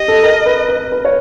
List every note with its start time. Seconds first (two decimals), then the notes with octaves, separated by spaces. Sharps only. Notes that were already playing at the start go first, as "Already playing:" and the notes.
Already playing: G4 D#5
0.08 A4
0.23 A#4
0.46 B4
0.69 B4
0.92 B4
1.05 C#5